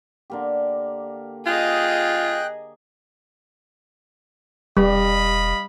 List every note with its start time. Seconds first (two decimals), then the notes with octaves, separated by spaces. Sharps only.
0.30 D3 A#3 G4
1.46 F4 G#4 D#5 G5 F#6
4.77 E1 G3 D#5 F5 B5